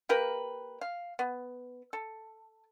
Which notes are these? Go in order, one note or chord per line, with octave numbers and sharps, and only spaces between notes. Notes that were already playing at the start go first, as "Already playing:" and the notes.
A#3 G4 A#4 B4
F5
B3
A4